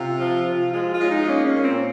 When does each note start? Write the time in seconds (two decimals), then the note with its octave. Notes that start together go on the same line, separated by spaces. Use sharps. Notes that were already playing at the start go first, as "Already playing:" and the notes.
Already playing: C3 F4
0.19 F3
0.47 F3
0.73 G#3 F4
0.92 F4
1.00 G#3 C#4
1.10 D#4
1.27 A#3 C#4
1.45 C#4
1.55 A#2
1.64 C4